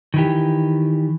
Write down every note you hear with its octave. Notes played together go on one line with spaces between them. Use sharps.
D#3 E3 G4